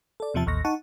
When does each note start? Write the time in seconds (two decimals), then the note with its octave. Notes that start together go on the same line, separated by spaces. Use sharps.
0.20 A4 D5
0.34 E2 C3 F3 E5 A5
0.46 A1 D#2 C#6 A#6
0.64 D#4 F#5 A5 C#6